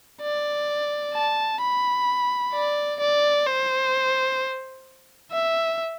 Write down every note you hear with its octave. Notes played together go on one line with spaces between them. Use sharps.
D5
A5
B5
D5
D5
C5
E5